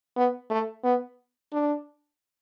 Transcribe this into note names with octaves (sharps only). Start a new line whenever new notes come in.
B3
A3
B3
D4